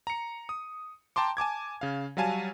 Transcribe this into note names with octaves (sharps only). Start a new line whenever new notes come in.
A#5 C#7
D#6
G5 A5 A#5 C6 D6
G#5 A5 D6 G#6
C#3 F5
F#3 G3 F5 G#5 A5 D#7